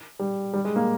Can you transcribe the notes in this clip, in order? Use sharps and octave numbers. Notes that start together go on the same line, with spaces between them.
G3
G3
G#3
A#3